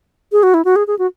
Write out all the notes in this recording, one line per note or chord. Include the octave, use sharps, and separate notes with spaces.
G#4
F#4
E4
F#4
G#4
G#4
F#4